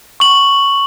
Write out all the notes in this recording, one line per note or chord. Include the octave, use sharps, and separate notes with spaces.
C#6 F#7